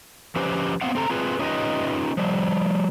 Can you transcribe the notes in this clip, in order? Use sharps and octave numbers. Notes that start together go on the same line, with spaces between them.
F3 C#4 G4 B4 C5
B3 C4 F5 F#5
C4 A4 A#5
C4 F4 G#4 B4
C#4 D#4 F4 G4 B4 D#5
F3 G3